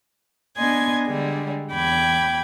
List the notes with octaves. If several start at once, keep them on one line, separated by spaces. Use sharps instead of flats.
B3 D4 D#5 G#5 C6 G#6
D3 G3 G#3
E2 G5 B5 D6 G#6